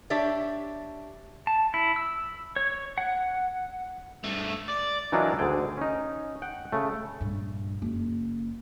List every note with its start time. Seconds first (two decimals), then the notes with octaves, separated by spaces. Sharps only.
0.10 D4 G4 C#5 D5 E5
1.47 A5
1.74 E4
1.96 E6
2.56 C#5
2.98 F#5
4.24 G2 A3
4.68 D5
5.12 E3 F#3 D4 D#4 F4 A#4
5.39 D2 D3 G#4 G5
5.77 C#4 D#4
6.42 F#5 G5
6.72 C#3 A3
7.20 A#1 G2
7.82 F#1